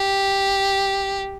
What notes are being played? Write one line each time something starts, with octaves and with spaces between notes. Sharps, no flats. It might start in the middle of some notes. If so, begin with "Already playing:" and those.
Already playing: G4